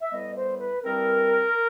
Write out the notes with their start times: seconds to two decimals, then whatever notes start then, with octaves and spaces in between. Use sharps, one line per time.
0.02 E5
0.11 A2 E3 G3 B3 D#5
0.35 C5
0.59 B4
0.83 G2 E3 G3 C4 A#4